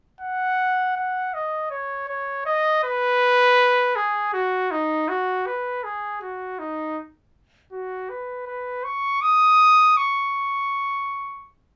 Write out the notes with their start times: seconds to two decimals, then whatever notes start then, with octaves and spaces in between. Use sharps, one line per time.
0.21 F#5
0.96 F#5
1.34 D#5
1.71 C#5
2.09 C#5
2.46 D#5
2.84 B4
3.96 G#4
4.34 F#4
4.71 D#4
5.09 F#4
5.47 B4
5.84 G#4
6.22 F#4
6.59 D#4
7.72 F#4
8.10 B4
8.47 B4
8.85 C#6
9.22 D#6
9.97 C#6